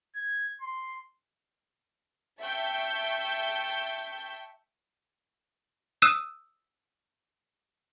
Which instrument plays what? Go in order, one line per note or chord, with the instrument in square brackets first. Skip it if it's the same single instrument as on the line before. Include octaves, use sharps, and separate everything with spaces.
[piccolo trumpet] G#6
C6
[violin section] E5 G5 A5 C#6 G6
[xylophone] D#6 E6 F#6 D#7 E7